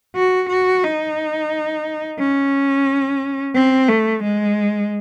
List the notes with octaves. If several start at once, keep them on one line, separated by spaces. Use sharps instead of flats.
F#4
F#4
D#4
C#4
C4
A3
G#3